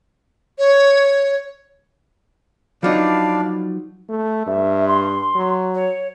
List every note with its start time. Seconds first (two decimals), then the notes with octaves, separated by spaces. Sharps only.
0.58 C#5
2.83 F3 F#3 D4 D#4 D5 F5 A5 B5
4.09 A3
4.46 G2 E5
4.87 C6
5.35 F#3
5.74 C#5